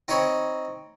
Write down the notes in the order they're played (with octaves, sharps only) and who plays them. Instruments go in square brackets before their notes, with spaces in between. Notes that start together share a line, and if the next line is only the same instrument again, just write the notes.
[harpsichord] C4 D#4 C5 C#5 B5